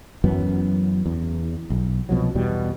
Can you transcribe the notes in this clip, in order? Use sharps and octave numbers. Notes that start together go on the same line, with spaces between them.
F#2 E3 F#3 B3
E2
B1
C2 B2 F3 F#3
E2 B2 G3